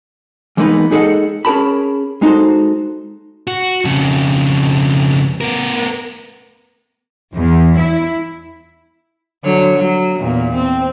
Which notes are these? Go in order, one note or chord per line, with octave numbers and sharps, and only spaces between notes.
E3 G#3 A#3 B3 D#4 B4
G#3 D#4 G#4 A4 D#5 F#5
C#4 G#4 A#4 A5 B5
G#3 D#4 F#4 A4 C5
F#4
F2 C#3
B3 A#4
E2
E4
D3 F#3 C#5
F#3
E2 A#2
C4